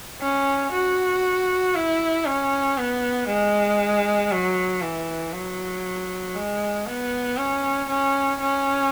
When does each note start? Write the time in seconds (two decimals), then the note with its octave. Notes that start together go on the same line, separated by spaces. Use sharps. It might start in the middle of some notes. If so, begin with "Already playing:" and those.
0.21 C#4
0.72 F#4
1.75 E4
2.26 C#4
2.78 B3
3.28 G#3
4.31 F#3
4.82 E3
5.33 F#3
6.35 G#3
6.86 B3
7.38 C#4
7.89 C#4
8.41 C#4